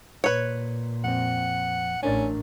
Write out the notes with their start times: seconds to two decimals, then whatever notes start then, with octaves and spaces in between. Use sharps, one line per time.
0.24 A#2 B4 C#5
1.04 F2 C4 F#5
2.03 A1 A2 C#4 D4 A#4 D5